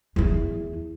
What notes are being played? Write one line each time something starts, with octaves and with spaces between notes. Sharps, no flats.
E2 E3